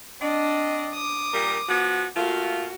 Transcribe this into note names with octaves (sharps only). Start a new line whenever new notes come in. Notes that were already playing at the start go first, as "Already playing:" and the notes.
C4 D4 D5 D#5
D6 D#6
A#2 G3 A#4
F3 B3 F#4
A3 A#3 F4 F#4